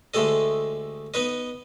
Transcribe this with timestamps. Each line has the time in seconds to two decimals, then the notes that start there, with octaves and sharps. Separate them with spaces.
0.14 D2 G#3 A3 G4 A4 D#5
1.14 B3 D#4 B4 D#5